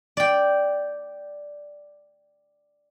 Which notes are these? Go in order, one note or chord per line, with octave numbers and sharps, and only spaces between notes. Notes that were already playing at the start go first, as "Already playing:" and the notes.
D5 G5